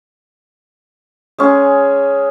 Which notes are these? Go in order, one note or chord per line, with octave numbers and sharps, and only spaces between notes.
G#3 C#4 G#4